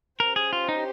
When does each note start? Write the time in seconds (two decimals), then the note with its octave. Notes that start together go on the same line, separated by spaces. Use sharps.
0.20 C#4 G4 A#4 C5
0.36 G#4
0.53 F4
0.69 D#4